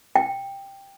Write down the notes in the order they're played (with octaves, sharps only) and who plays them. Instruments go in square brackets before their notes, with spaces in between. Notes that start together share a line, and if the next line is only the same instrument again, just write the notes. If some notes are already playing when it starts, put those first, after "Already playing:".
[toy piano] G5